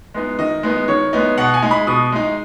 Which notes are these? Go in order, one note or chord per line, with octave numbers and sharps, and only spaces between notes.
G#3 B3 D#4
D#3 D#5
G#3 B3 D#4
D#3 C#5
G#3 B3 D#4
B2 F#5
G#5
G#3 D#4
B5
B2 D#6
G#3 D#4